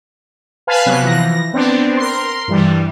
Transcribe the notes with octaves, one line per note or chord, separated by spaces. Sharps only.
B4 F5 G#5 A5 B5
C3 F#3 B3 F#6
E3 F3 A#6
B3 C4 D4
A#4 C6
G2 E3 G3